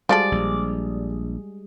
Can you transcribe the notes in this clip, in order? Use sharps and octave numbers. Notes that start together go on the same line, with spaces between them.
F3 G3 G#3 F#4 G#4 A4 D5
A#1